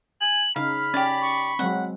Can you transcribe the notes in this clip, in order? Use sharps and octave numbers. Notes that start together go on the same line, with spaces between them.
G#5 F#7
C#3 D#4 F5 B5 F6
C#4 G4 D5
C#6
F#3 G#3 C4 F#5